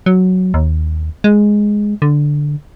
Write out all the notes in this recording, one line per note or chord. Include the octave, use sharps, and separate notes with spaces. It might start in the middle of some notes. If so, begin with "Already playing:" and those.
F#3
D#2
G#3
D3